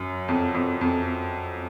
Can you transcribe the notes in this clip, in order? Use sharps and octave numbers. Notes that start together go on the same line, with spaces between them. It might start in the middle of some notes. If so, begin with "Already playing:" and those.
Already playing: F#2
F2
F2
F2